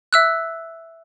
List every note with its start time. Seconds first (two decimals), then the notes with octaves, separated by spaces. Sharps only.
0.13 E5 E6 F#6